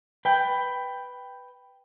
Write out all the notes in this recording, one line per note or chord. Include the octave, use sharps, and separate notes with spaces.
B4 G5